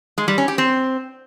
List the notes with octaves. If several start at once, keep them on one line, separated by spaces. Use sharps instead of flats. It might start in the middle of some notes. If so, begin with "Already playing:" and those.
G#3
G3
C#4
G4
C4